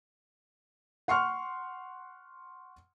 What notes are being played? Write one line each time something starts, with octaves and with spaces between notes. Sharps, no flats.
F#5 C6 C#6 F6